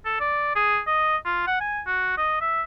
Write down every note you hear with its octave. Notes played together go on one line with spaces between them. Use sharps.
A4
D5
G#4
D#5
F4
F#5
G#5
F#4
D#5
E5